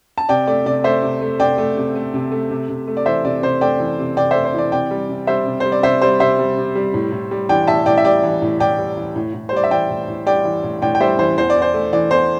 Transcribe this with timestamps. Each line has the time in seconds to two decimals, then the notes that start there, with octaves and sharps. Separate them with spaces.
0.18 A5
0.29 C3 D5 G5
0.47 A3 D5
0.66 C3 D5
0.84 A3 C5 E5
1.02 C3
1.21 A3
1.40 C3 D5 G5
1.58 A3
1.77 C3
1.95 A3
2.14 C3
2.32 A3
2.50 C3
2.69 C3
2.87 A3
2.97 D5
3.06 E3 C5 E5
3.25 C3 D5
3.43 C3 C5
3.61 A3 D5 G5
3.80 E3
3.98 C3
4.17 C3 D5 G5
4.31 A3 C5 E5
4.45 C5
4.54 E3 D5
4.72 C3 D5 G5
4.91 G3
5.09 C3
5.27 G3 C5 E5
5.46 C3
5.60 G3 C5
5.72 D5
5.83 C3 C5 E5
6.01 G3 C5
6.20 C3 C5 E5
6.39 G3
6.57 C3
6.75 G3
6.94 A2
7.12 A2
7.31 G3
7.49 E3 D5 G5
7.67 A2 E5 A5
7.86 A2 D5 G5
7.98 E5
8.04 G3 D5 G5
8.23 E3
8.42 A2
8.60 A2 D5 G5
8.79 G3
8.97 E3
9.16 A2
9.34 A2
9.49 C5
9.53 G3 D5
9.64 E5
9.71 E3 D5 G5
9.89 A2
10.08 A2
10.26 G3 D5 G5
10.45 E3
10.64 A2
10.82 A2 D5 G5
10.95 G5
11.00 G3 C5 E5
11.19 E3 C5
11.38 E2 C5
11.50 D5
11.56 E2
11.62 C5
11.74 A3
11.93 E3 D5
12.11 E2 C5